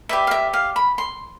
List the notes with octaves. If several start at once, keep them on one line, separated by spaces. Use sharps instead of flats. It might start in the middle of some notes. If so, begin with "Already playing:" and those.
G4 B4 D5 E5
F5
E5
F5
B5
C6